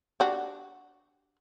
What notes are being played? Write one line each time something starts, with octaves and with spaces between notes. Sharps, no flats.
D4 F#4 G4